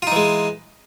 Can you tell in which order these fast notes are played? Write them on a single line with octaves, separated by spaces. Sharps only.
F4 D#4 E3 G#3